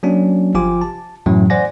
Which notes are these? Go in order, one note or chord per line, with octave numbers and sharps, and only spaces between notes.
F#3 A#3 C#4 D4 F#4
G1 F3 F4 G4 G#5 D6
A5
F#2 A2 E3 F#3 A3 C#4
C5 D5 F#5 G#5 A#6